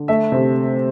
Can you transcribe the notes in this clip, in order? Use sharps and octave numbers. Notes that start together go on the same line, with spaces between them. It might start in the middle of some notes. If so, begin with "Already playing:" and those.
Already playing: D3
A3 E5
C3